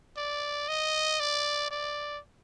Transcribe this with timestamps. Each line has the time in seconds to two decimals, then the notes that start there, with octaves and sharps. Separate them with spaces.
0.17 D5
0.69 D#5
1.20 D5
1.71 D5